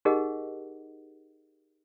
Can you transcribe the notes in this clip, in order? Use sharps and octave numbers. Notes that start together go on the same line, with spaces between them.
D#4 G4 G#4 A#4 D#5 F#5